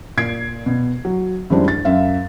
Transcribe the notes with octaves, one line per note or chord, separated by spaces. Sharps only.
A#2 G#6 C7 D7
B2
F#3
F#2 E3 G3 G#3 C4 D4
A6
F#2 E5 F5